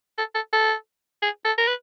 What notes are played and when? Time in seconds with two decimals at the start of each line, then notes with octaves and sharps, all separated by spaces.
0.18 A4
0.35 A4
0.53 A4
1.22 G#4
1.45 A4
1.58 A#4
1.67 B4